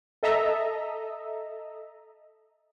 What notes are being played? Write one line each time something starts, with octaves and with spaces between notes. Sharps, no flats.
A4 D#5 E5 A#5